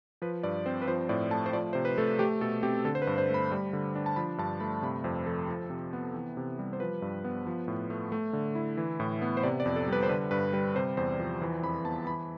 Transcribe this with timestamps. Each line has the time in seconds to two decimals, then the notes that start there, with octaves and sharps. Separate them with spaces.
0.22 F3 B4
0.43 G2 D5
0.66 C4 C5
0.82 B4
0.88 F3 C5
1.09 A2 D5
1.31 A3 A5
1.46 C5
1.53 F3 D5
1.73 C3 C5
1.85 B4
1.98 A3 A4
2.19 A3 G4
2.41 B2 A4
2.63 C4 G4
2.85 D3 A4
2.95 C5
3.02 B4
3.07 G2
3.18 C5
3.29 A3 B5
3.52 G3
3.73 D3
3.95 D4
4.06 A5
4.16 F3 B5
4.38 G2 A5
4.60 A3 B5
4.83 C3 B5
5.04 F2 C5
5.26 F3 A4
5.48 F3
5.70 C3
5.93 B3
6.14 E3
6.37 C3
6.59 G3
6.73 C5
6.80 F3 B4
7.02 G2
7.24 B3
7.47 F3
7.68 A2
7.90 A3
8.12 A3
8.33 D3
8.55 E4
8.77 E3
9.00 A2
9.22 B3
9.37 C5
9.43 C3 D5
9.60 D5
9.66 F2
9.76 A4
9.88 G3 B4
10.03 C5
10.09 D3 B4
10.31 G2 B4
10.53 G3 B4
10.75 C3 C5
10.97 E2 C5
11.20 F3
11.42 E3
11.63 F2 B5
11.85 B3 A5
12.06 E3 B5